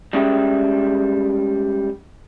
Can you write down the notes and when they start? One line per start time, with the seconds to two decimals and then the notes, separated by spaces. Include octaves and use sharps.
0.13 G3 G#3 C#4 G#4 E5 G5